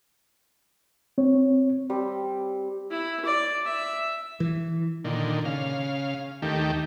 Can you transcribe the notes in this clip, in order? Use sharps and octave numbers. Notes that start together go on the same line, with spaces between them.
C4 C#5
G3 C4
E4
D5
E5
E3
A#2 D3 D#3
C#3 F5
D#2 D#3 A3 G4